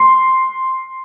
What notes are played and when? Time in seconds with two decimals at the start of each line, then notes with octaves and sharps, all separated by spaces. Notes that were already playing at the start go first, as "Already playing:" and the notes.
Already playing: C6